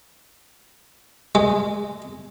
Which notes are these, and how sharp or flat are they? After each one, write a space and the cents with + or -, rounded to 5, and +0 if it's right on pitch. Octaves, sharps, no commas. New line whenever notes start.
G#3 -10